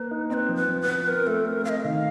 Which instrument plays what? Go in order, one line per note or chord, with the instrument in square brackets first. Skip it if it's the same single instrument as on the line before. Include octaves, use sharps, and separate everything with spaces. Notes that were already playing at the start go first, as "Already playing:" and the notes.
Already playing: [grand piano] A#3 [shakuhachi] B4
[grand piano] D#4
[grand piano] C4 [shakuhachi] B4 D#5
[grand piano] F3
[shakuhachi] B4
[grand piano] F3
[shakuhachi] B4
[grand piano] F3
[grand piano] C4 [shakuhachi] A#4
[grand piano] A3 [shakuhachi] A4
[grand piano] C4 [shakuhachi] A#4
[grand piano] A3 [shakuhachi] D#5 F5
[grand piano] D#3 [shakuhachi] F5